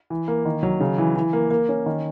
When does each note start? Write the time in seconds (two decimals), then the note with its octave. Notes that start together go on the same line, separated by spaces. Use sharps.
0.10 E3
0.28 A#3
0.45 D#3
0.63 F#3
0.80 C#3
0.98 E3
1.16 E3
1.33 A#3
1.51 A#3
1.69 C#4
1.86 D#3